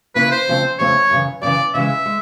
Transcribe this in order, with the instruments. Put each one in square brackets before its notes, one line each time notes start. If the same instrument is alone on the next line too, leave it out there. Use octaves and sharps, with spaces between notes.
[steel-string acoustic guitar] C#3 F3 A#3 C#4 E4 [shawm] B4
[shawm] C5
[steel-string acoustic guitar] F2 C#3 F3 A3 C4
[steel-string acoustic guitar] F2 C#3 F3 A3 C4 [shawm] C#5
[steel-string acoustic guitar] F#2 C#3 E3
[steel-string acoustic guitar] F#2 C#3 E3 [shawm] D5
[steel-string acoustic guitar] C#3 E3 G#3 [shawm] E5
[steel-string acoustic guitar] G#3